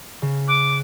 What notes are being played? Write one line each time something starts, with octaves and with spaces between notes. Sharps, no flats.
C#3
D6 F#6